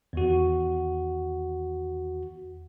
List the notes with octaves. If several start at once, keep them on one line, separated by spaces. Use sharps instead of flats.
E2 D#3 F#4